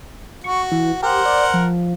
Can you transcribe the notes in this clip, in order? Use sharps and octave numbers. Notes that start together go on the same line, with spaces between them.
F#4 C#6
E3
G4 A#4 C5 F#5
D5
F3